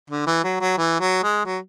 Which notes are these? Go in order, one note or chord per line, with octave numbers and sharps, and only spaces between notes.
D3
E3
F#3
F#3
E3
F#3
G#3
F#3